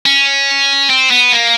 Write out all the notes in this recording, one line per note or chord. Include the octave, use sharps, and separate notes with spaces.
C#4
C4
B3
A#3